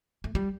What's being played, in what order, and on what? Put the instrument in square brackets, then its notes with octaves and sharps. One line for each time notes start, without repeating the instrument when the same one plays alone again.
[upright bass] A3
G3